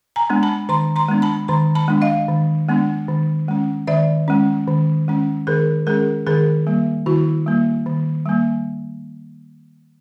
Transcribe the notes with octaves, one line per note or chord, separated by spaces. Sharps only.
G#5 A#5
G#3 B3 D4
A5 B5
D#3 A#5 C6
A#5 C6
G#3 B3 D4
A5 B5
D#3 A#5 C6
A5 B5
G#3 B3 D4
D#5 F5
D#3
G#3 B3 D4
D#3
G#3 C#4
D#3 D5 E5
G#3 C#4
D#3
G#3 C#4
D#3 G#4 A#4
G#3 C#4 G#4 A#4
D#3 G#4 A#4
G3 A#3
D#3 E4 F#4
G3 A#3
D#3
G3 A#3